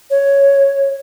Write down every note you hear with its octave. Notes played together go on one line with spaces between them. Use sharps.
C#5